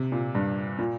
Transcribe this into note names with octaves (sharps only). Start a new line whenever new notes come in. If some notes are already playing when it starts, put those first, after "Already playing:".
Already playing: C3
A#2
G2
A#2